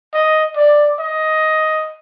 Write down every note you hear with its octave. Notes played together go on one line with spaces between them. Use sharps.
D#5
D5
D#5